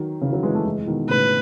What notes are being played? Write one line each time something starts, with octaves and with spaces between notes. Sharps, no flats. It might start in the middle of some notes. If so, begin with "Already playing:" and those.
Already playing: D#3 F#3
C#3 E3
D#3 F#3
E3 G#3
F#3 A3
E3 G#3
E3
B2 D#3
A2 C#3 B4